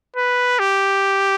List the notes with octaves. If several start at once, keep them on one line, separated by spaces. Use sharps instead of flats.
B4
G4